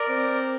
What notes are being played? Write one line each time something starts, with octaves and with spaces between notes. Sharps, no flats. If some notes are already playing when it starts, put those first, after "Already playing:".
Already playing: A#4 D5
C4